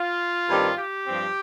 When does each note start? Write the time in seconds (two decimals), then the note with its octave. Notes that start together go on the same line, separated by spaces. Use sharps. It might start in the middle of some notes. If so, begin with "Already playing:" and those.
Already playing: F4
0.50 G2 D#3 G3 C4
0.78 G4
1.06 G2 F3 C4